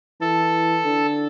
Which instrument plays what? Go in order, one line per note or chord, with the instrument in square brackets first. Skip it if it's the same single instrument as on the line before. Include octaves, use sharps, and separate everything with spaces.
[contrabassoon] E3 [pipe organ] A4
[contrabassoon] D3